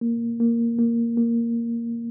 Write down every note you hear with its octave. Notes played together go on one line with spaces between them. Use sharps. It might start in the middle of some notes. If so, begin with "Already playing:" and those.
A#3
A#3
A#3
A#3